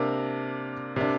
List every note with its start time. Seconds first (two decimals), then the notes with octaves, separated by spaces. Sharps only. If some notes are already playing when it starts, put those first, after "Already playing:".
Already playing: C3 A#3 D4
0.96 C3 A#3 D4